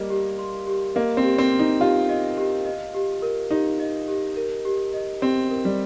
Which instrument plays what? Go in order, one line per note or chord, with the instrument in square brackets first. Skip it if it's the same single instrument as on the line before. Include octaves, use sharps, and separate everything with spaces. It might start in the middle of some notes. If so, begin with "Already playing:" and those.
Already playing: [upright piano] G3 A#3 [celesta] G4 D#5
[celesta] G4
C6
G4
[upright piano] A#3 [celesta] D#5
[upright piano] C4
[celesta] G4
[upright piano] C4
[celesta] C6
[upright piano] D#4
[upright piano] F4 [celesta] G4
[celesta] D#5
G4
D#5
G4
A#4
[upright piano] D#4 [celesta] G4
[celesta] D#5
G4
A#4
G4
D#5
[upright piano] C4 [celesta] G4
[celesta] A#4
[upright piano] G3